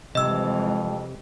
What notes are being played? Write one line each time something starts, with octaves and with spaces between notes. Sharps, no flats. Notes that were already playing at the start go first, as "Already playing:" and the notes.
F2 C3 E3 G3 G#3 D#5 E6